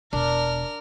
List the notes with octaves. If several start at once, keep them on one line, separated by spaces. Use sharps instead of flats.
E1 D4 A#4 F6